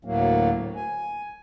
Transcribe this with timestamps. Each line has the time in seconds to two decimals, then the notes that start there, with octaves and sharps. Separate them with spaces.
0.05 D2 A2 F#3 A#3
0.76 G#5